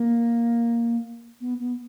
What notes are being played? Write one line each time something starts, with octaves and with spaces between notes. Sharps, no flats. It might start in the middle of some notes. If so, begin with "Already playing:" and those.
Already playing: A#3
B3
B3